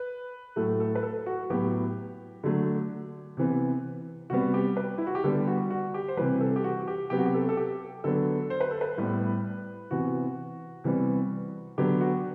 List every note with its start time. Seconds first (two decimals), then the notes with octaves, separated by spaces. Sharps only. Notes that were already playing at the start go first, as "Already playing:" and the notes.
Already playing: B4
0.56 A2 F#3 A3 A4
0.80 A4
0.95 B4
1.03 A4
1.26 F#4
1.50 A2 F#3 B3 G4
2.44 D3 F#3 A3
3.37 C3 E3 B3
4.30 C3 G3 B3 F#4
4.54 G4
4.77 B4
4.98 E4
5.07 F#4
5.15 G4
5.24 D3 G3 B3 A4
5.48 F#4
5.71 F#4
5.94 G4
6.08 C5
6.17 C3 E3 G3 B4
6.41 A4
6.56 G4
6.64 F#4
6.88 G4
7.10 C3 F#3 B3 G4
7.19 F#4
7.26 G4
7.34 A4
7.49 A4
7.57 G4
8.04 D3 F#3 B3 A4
8.50 C5
8.61 B4
8.71 A4
8.81 B4
8.97 A2 G3 B3
9.91 C3 E3 B3 F#4
10.84 C3 E3 G3 B3
11.78 D3 F#3 B3 G4
12.01 F#4